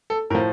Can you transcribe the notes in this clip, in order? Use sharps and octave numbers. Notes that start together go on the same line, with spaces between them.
A4
A2 F3 A#4